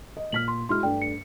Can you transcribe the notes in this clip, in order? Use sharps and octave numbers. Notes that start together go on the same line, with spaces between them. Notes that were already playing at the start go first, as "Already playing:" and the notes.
D#5
A#2 F6 B6 F#7
C6
G#3 E4 F#4 C6 F6
G2 A3 D5 G5
C#7